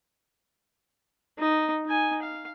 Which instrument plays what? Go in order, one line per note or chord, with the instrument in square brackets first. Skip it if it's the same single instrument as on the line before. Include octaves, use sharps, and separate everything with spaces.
[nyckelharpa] D#4
D#4 G#5
F5